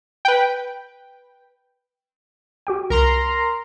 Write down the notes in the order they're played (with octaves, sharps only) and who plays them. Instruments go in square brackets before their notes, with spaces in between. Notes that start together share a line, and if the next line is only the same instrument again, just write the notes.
[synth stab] B4 G5
[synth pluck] F#4 G4 G5
[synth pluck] C2 [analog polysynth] A#4 A#5 C6